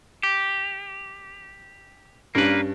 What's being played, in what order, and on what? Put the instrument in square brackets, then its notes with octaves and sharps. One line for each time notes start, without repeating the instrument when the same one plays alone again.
[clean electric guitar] G4
[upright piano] G2 C#4 D4 [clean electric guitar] A#3 B4